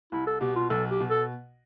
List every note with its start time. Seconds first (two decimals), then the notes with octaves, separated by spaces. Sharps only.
0.12 C2 E4
0.27 A4
0.41 B2 G4
0.56 F4
0.70 B1 A4
0.89 G4
1.00 B2
1.10 A4